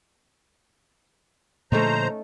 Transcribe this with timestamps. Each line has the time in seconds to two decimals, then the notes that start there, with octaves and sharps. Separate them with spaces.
1.72 A#2 D3 F3 A3 C#4 D#4 C5 A#5